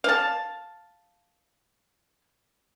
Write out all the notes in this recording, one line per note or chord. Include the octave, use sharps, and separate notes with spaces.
F5 A5